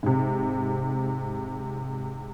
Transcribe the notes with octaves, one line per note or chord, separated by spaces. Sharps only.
G#2 C3